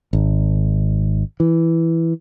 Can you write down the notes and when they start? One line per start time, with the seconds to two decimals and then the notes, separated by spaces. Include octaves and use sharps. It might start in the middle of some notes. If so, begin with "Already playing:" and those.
0.13 G#1
1.40 E3